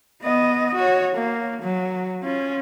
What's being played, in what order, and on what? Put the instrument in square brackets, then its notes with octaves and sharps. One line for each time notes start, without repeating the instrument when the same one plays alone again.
[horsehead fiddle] B3 D#5
F#4 C#5
A#3
F#3
C#4 F4